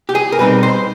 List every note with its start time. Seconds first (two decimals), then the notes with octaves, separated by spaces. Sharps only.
0.09 G4
0.15 G#4
0.32 A#4
0.38 B2 G3 C4 D#4 B4
0.63 C5